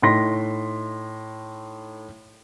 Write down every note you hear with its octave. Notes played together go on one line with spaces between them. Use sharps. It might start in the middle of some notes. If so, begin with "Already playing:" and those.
A2 D#4 C6 A#6 B6